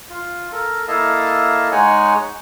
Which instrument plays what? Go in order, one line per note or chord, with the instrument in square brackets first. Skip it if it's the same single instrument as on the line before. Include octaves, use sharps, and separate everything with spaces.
[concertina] F4
A4 A#4
A#3 E4 A4 D#5 F5 A5
G#3 D#4 C#5 F#5 G#5